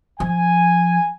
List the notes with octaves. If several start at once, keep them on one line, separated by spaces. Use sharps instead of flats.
F3 G#5